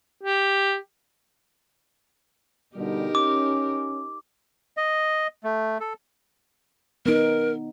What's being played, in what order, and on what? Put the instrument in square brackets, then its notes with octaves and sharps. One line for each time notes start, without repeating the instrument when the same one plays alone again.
[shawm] G4
[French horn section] B2 D3 G3 [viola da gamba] D#4 G4 A#4
[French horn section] C#4 [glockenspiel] D6
[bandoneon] D#5
A3
A4
[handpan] B3 D#4 [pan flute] A#4